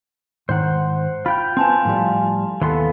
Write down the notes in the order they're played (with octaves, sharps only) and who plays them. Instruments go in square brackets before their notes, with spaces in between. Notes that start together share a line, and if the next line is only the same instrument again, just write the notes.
[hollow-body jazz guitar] G#2 D#3 [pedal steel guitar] C5 F#5
[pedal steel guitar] F4 G5 G6 [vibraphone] F5 [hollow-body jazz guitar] B5
[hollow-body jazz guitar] B3 C4 [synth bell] G#5 A5 C6
[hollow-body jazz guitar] A2 F3 G3
[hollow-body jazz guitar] D#2 C6 [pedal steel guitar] E3 B3 A4